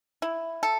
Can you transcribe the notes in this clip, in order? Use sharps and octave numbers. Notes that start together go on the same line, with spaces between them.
E4
A4